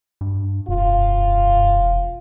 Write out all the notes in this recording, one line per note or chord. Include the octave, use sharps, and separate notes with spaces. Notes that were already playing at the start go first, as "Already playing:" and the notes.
G2
E1 F#2 F4